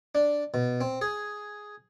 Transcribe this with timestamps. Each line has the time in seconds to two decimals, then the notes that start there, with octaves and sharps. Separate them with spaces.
0.15 D4
0.54 B2
0.81 C4
1.01 G#4